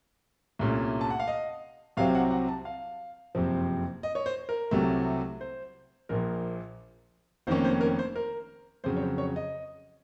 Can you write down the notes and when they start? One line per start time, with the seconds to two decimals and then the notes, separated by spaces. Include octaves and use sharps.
0.59 C2 A#2 A3 C#4
1.01 A5
1.10 F#5
1.20 F5
1.28 D#5
1.97 C2 C3 F#3 C4 F5
2.15 F#5
2.31 F#5
2.48 A5
2.65 F5
3.35 F#1 F2 C3 F3 C4
4.03 D#5
4.15 C#5
4.26 C5
4.49 A#4
4.71 C2 C3 F#3 A3
5.41 C5
6.09 A#1 A#2 F3 A#4
7.47 F1 F2 D#3 A#3 C#4 C5
7.65 C5
7.81 A#4
7.99 C5
8.16 A#4
8.84 F2 C#3 F#3 C5
8.97 C#5
9.02 C5
9.18 C#5
9.36 D#5